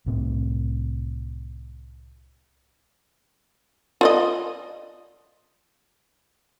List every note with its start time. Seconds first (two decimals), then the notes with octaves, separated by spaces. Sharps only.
0.06 C2 A2 C4
4.01 F4 D5 D#5